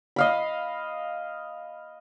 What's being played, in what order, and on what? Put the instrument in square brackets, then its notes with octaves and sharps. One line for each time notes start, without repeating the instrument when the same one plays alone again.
[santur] D#5 F5 B5